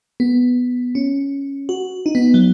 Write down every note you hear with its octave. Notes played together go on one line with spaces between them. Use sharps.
B3
C#4
F#4
D#4
B3
F#3